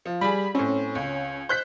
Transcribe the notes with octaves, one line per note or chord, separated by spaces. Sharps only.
F3
G3 G#4 B5
A2 C4 C#4
C#2
C5 F#6 G6 B6